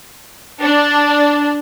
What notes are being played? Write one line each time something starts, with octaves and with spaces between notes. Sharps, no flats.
D4